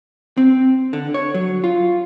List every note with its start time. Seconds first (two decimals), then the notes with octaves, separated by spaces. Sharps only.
0.37 C4
0.93 D3
1.14 C#5
1.34 F#3
1.64 F4